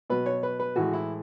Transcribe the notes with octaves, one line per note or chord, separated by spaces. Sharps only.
B2 F#3 B4
C#5
B4
B4
A2 E3 G#3 F#4
E4